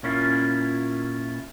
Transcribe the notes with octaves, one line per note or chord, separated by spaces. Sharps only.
A#2 C#4 E4 F4